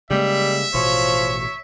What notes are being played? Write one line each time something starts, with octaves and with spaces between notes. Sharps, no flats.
C#3 G3 G#3 A#3 E5
A1 B2 F3 C#5